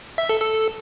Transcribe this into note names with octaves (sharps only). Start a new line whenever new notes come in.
E5
A4
A4